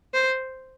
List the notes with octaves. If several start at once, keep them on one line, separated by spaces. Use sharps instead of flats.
C5